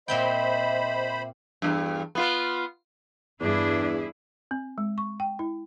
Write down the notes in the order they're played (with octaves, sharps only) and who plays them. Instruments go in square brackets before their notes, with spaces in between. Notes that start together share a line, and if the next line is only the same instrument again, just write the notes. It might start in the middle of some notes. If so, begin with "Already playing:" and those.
[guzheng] A#2 C4 G5 [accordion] C5 B5 [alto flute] D#5 [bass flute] E5
[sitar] E2 G2
B3 F4 B4
[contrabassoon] E2 [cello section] G2 E4 G#4 [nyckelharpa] D4
[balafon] C4
G#3
C#6
G5
E4